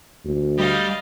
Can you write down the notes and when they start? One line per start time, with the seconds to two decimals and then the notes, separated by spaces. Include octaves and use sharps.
0.25 D2
0.58 G3 D#5 F5